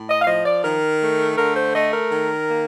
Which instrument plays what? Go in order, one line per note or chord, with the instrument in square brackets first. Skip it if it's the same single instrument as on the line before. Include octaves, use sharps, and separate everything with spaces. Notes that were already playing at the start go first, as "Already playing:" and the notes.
Already playing: [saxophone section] A2
D#5
F5
F3 D#5
D5
D#3 A#4
A3
D3 A#4
C5
A3 D#5
A#4
D#3
A#3